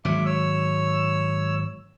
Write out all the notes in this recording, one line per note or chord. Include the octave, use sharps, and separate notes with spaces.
G#1 F#3 E5 D6
C#5 E6